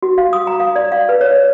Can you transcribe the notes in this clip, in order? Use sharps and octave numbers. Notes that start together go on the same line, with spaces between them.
F#4
F5
D#6
A#5
F5
D5
F5
B4
C#5